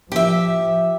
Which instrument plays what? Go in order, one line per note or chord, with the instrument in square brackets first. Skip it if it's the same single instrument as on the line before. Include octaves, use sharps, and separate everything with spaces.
[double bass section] F3 [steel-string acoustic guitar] G4 E5